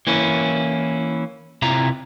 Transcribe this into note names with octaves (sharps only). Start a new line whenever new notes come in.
E3 A#3 C#4 E4
C3 E4 F4 A#5